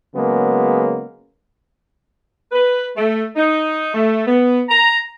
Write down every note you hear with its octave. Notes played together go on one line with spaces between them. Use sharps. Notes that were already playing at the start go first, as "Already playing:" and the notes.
C#3 F#3 G#3 A#3 B3
B4
A3
D#4
A3
B3
A#5